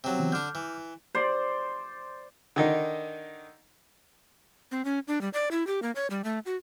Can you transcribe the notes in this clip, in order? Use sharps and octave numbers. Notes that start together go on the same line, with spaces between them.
C3 F#3
C#3 E3 B3
D3 D4 D6 F6 G6
E3
C5 D5
D3 D#3 D#4
C4
C#4
D4
G3
D5
E4
G4
A#3
C#5
G3
A3
F#4